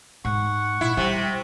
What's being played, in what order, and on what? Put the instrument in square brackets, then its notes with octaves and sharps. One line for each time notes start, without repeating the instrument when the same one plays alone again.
[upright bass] G#2 [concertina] F#5 C#6
[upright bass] A#2 [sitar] E4
[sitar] C3 [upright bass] G3